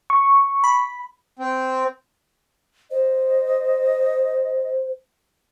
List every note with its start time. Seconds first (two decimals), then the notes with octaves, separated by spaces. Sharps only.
0.10 C#6
0.64 B5
1.39 C4
2.91 C5 D#5